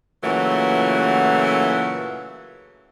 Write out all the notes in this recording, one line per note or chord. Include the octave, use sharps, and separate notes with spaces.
A#2 C#3 E3 F#3 A3 F#5